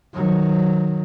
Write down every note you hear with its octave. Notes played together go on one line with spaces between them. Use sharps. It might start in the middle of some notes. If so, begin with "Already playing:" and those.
D#3 F#3